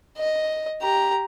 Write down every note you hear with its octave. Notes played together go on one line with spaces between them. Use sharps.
D#5
G4 A#5